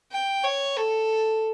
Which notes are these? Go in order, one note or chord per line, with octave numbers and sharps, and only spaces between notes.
G5
C#5
A4